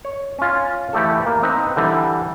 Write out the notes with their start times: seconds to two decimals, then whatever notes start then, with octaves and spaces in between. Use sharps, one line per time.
0.05 C#5
0.39 C#4 F4
0.93 E3 A3 G4 A4
1.26 A#3
1.42 C4 D#4 B4
1.76 D3 E3 G3